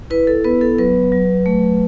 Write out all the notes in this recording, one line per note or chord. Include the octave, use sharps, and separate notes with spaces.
E4 B4
A4
B3 B4
A4
F#3 B4
F#3
A3